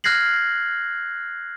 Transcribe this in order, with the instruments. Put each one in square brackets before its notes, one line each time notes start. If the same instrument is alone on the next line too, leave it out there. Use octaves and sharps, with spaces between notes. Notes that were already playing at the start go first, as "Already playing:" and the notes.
[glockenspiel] F6 F#6 G#6 A#6 C7 F#7